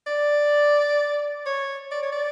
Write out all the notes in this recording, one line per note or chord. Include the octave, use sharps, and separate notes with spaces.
D5
C#5
D5
C#5
D5